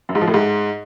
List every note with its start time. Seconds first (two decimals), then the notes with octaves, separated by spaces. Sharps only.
0.09 F#2
0.15 G#2
0.21 F3
0.28 A2
0.34 G#2